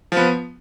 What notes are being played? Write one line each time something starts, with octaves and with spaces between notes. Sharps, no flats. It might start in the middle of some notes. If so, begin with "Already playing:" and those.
F3 B3